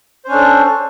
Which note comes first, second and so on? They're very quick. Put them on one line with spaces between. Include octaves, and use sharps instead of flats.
C5 C#4 D4 A4